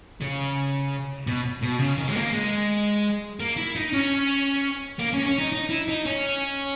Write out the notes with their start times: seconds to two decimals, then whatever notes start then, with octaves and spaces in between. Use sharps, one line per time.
0.21 C#3
1.27 B2
1.63 B2
1.80 C#3
1.98 D#3
2.08 G#3
2.16 A#3
2.33 G#3
3.40 A#3
3.57 E4
3.76 D#4
3.93 C#4
4.99 A#3
5.13 C#4
5.26 C#4
5.39 D#4
5.52 D#4
5.69 E4
5.88 D#4
6.06 C#4